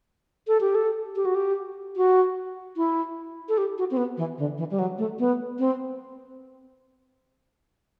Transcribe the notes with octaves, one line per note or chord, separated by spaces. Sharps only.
A4
G4
A4
G4
F#4
G4
F#4
E4
A4
G4
F#4
C4
B3
E3
D3
E3
G3
F#3
A3
B3
C4